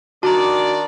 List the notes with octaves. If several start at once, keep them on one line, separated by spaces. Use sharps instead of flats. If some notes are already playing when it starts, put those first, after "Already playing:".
D#3 D4 F#4 D5 A5 A#5